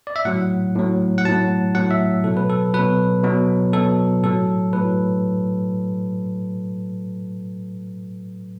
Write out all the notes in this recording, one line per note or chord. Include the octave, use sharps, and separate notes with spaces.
D5
E5
A2 F#3 F#5
A2 F#3
F#5
A2 F#3 A5
A2 F#3 F#5
E5
B2 F#3 A4
B4
A4
B2 F#3 B4
B2 F#3
B2 F#3 A4
A2 F#3 A4
A2 F#3 B4